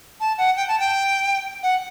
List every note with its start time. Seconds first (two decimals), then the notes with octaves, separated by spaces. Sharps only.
0.20 A5
0.38 F#5
0.57 G5
0.68 A5
0.80 G5
1.63 F#5